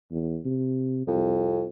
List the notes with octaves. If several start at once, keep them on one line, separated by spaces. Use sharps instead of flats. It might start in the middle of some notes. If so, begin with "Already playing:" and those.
E2
C3
C2 F2